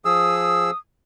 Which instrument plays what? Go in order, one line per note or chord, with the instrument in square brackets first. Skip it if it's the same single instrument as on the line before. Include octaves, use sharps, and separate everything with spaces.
[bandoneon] F3 G#4 E6 [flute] D#6